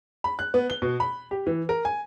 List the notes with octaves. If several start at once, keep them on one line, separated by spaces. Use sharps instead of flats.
B5
F#6
B3
G7
B2
B5
G4
E3
A#4
G#5